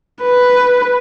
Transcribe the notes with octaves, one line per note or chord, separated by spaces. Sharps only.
B4